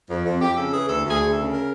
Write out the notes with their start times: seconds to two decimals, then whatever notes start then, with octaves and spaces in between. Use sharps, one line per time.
0.09 F2
0.25 F2
0.40 F2 G4
0.56 C#3 A4
0.72 E3 G#4
0.88 D2 A4
1.04 D2
1.09 G#4
1.19 D2
1.30 A4
1.35 C#3
1.51 A#4